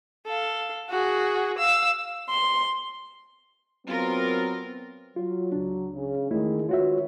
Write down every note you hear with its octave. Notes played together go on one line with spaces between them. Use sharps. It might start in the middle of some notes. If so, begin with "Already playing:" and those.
A4 F5
F#4 G#4
F5 E6
C6
F#3 B3 C4 F4 A#4
F#3 F4
C#2 D4
C#3
E2 D#3 G#3 A3 E4
D#3 F4 F#4 B4 C#5 E5